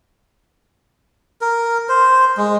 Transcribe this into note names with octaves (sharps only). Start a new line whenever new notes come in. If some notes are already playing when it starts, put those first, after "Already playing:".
A#4
C5
G#3